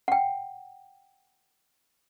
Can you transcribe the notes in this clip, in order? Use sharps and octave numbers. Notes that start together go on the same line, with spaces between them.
F#5 G5